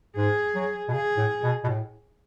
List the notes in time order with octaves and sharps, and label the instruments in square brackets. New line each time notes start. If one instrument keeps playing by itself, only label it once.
[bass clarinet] G#2 [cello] G#4
[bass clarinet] F#3
B2
[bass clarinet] C#3 [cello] G#4
[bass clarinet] A2
B2
B2
A2